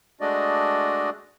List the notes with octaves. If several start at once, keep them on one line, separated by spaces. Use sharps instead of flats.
G#3 A3 D4 F#4 D5 D#5